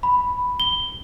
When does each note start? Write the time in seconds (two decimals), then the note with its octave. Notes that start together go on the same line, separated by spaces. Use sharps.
0.03 B5
0.60 G7